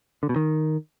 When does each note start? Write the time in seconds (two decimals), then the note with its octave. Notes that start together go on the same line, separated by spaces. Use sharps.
0.23 D3
0.29 B2
0.36 D#3